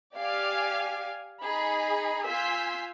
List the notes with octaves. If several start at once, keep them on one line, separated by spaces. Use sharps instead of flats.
G4 D5 F5 G#5
D#4 G#4 B5
F4 G#5 C6 E6 G6 B6